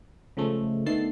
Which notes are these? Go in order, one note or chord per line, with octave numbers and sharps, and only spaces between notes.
C#3 F3 G#3 A3
D3 D#3 A3 B3 A5 C7